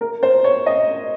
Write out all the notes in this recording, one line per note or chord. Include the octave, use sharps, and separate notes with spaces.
A#4
C5
C#5
D#5